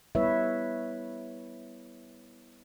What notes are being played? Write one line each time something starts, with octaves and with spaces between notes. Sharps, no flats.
G3 B3 E4 B4 C#5 E5